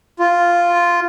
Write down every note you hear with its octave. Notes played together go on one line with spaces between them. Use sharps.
F4